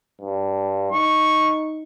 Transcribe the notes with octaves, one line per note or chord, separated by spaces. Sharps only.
G2
D#4 C#6